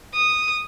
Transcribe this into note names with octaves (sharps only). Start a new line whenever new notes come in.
D#6